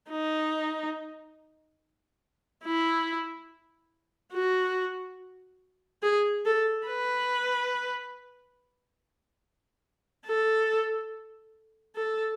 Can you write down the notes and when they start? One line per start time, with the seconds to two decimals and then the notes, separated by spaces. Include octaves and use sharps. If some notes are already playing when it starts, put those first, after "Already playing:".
0.10 D#4
2.64 E4
4.33 F#4
6.03 G#4
6.45 A4
6.87 B4
10.26 A4
11.96 A4